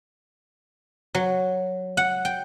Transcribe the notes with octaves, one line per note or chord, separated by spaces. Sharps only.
F#3
F#5
G5